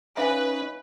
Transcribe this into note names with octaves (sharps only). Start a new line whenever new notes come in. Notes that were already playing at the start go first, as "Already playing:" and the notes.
C#4 D#4 B4 E5 F5 G#5